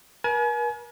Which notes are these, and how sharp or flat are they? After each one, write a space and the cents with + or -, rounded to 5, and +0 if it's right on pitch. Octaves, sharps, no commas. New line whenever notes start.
A#4 +45 G#5 +40